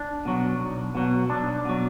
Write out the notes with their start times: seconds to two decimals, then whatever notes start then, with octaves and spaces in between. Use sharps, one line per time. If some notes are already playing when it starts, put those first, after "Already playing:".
Already playing: D4
0.25 B2 F#3
0.60 B1
0.95 B2 F#3
1.30 B1 D4
1.65 B2 F#3